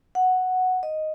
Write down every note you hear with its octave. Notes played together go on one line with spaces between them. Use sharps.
F#5
D#5